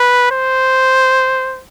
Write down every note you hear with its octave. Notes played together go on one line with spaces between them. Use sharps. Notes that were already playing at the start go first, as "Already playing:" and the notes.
Already playing: B4
C5